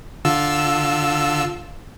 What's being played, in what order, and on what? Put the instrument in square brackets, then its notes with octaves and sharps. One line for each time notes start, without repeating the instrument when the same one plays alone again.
[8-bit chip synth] D3 F4 E6